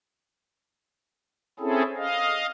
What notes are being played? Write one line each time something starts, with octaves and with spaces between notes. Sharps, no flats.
C4 C#4 E4 G#4 A4
D#5 F5